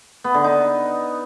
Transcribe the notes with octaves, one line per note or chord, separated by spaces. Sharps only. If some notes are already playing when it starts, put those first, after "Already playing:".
B3
D3
D#4